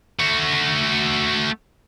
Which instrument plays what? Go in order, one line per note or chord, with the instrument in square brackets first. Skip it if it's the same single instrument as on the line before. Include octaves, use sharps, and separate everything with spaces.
[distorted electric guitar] A3 F#4